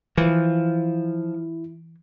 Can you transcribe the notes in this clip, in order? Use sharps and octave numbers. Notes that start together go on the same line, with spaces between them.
E3 F3 E4